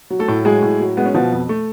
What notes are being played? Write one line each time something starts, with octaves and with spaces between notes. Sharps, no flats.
F#3
A3 A4
A2
F#3 G#3 G#4
A2
F#3
G#3 B3
C#4
B2 F3 B3
F2
A3